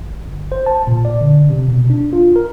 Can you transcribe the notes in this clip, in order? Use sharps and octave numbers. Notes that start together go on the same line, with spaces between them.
G#1
G1
C5
A5
A#2
D5
D3
C3
B2
D4
F4
A#4